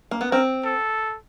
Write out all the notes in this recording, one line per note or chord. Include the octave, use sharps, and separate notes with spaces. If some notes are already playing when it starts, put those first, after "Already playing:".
A#3
B3
C4 A#4
A4